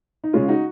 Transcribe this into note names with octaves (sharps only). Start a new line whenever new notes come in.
D#4
C#3 G#3 C#4 F4
D#4 F#4